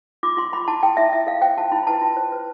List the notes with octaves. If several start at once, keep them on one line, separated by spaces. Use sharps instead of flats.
F4 D6
F4 C6
A4 B5
E4 A5
A4 G5
E4 E5
F4 E5
A4 F5
C5 G5
F4 A5
E4 B5
B4 A5
F4
C5
B4